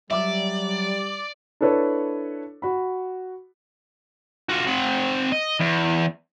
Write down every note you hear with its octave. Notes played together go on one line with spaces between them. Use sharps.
F#3 G3 D5 E5 D6
D4 E4 A4 B4 C#5
F#4 B5
F4 F#4
C4 F#5
D#5
E2